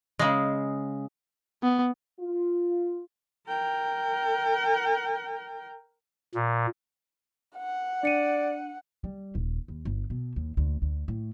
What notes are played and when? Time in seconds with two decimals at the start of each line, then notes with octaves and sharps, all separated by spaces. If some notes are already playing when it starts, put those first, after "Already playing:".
0.19 C#3 G#3
1.63 B3
2.20 F4
3.48 A#4 G5
6.35 A#2
7.57 F#5
8.03 D4 D5 C#7 D#7
9.04 G3
9.35 D#1
9.68 D#2
9.85 G1
10.10 B2
10.36 D#2
10.57 D2
10.82 D2
11.08 A2